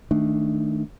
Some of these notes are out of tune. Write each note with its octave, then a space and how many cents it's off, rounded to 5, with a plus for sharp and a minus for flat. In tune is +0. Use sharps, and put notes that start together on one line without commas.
D#3 +0 A3 +0 D4 +10